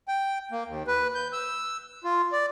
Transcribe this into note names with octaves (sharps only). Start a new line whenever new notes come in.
G5
A#3
D#2
B4
G6
E6
F4
D5